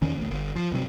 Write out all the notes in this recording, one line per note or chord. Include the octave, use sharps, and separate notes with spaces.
E2 D#3 C#4
A1 D2
G1
F3
G2 C3 F3 F#3